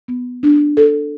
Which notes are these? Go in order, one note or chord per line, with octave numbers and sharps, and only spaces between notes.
B3
D4
A4